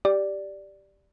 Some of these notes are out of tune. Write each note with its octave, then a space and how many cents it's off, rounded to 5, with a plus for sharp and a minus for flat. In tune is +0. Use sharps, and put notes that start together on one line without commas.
G4 +0 D5 +0